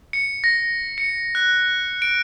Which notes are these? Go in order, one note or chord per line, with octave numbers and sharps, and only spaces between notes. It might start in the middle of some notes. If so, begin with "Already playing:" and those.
C#7
A#6
C#7
F#6
D7